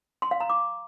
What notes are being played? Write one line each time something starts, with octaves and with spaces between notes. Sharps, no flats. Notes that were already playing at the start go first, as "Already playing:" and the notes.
C6
F5
A#5
D6